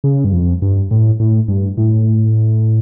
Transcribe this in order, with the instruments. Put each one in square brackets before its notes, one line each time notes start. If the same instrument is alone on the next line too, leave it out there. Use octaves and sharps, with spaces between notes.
[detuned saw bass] C#3
G2
F2
G2
A2
A2
G2
A2